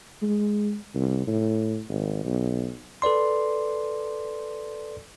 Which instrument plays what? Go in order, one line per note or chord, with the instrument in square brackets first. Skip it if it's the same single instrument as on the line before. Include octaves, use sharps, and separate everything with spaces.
[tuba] G#3
C2
A2
G#1
B1
[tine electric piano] A4 B4 D5 C6